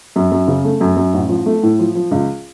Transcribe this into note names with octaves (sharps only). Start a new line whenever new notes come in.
F#2
F#2
C#3
A3
F#2
F#2
A1
F3
A3
A2
F3
F3
C#2